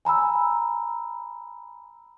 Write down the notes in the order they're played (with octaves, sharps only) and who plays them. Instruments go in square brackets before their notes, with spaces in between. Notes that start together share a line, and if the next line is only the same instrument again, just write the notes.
[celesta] G#5 A#5 B5 E6